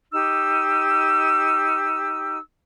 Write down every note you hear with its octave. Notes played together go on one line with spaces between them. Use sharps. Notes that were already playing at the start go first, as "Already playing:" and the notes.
D#4 G4 E6